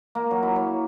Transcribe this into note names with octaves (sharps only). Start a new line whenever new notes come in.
A#3
F#3
E4
C#5